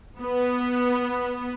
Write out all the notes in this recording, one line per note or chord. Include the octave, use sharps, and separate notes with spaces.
B3